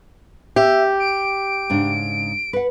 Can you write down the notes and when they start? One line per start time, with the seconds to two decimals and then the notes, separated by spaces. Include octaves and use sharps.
0.56 G4 E5
1.00 D7
1.70 G#2 C#3 D4
2.53 B4 F#5